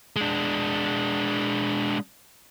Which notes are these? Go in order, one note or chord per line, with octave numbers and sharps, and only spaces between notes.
G#3 D4